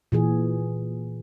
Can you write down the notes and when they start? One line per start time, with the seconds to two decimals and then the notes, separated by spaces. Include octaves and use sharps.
0.12 A#2 E3 G#4